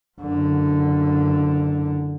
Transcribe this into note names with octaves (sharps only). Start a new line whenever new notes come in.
F#1 D3